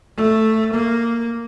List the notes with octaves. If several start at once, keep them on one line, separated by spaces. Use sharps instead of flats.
A3
A#3